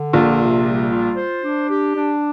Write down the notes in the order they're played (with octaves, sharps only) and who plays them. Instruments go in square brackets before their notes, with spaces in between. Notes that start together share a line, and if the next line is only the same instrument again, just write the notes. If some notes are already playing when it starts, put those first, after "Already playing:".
Already playing: [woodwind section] D3
[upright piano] A#1 A#2 [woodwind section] F4
[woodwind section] C3
G3
F4
C5
D4
G4
D4